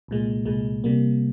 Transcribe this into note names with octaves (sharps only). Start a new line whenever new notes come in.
C2 A#2 G#3
C2 A#2 G#3
C3 G3 A#3